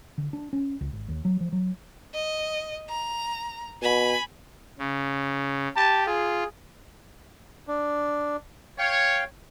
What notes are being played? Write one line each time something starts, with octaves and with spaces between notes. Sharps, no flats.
D3
D4
C#4
C#2
G#1
D#2
F#3
F3
F#3
D#5
A#5
B2 G#5 B5
C#3
G4 A5
F4 G#4
D4
C#5 F5 G5